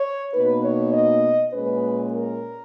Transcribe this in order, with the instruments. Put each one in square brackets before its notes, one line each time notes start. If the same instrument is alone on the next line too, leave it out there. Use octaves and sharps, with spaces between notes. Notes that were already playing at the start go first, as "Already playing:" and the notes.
Already playing: [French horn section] C#5
B2 A#3 D#4 B4
C#5
D#5
A#2 G#3 C#4 B4
A#4